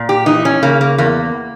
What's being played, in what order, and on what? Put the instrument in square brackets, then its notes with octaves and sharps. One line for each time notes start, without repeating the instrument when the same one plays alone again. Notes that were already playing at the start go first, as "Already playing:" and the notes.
Already playing: [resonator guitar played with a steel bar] A#2
G4
E3 D#4
C#4
C#3 A#3
A#3
E2 A#3